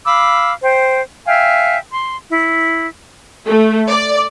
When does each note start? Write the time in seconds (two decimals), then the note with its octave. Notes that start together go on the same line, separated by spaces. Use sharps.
0.06 F5 B5 D6 E6
0.62 C5 G5
1.26 E5 F5 G5 G#5
1.92 C6
2.30 E4
3.48 A3
3.89 D5